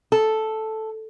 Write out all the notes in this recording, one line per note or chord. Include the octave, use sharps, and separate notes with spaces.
A4